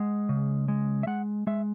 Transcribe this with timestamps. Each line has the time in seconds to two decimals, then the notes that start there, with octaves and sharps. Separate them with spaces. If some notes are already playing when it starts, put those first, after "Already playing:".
Already playing: G#3 F#5
0.29 C#3
0.68 G#3
1.03 E5
1.07 G#3 F#5
1.47 G#3 E5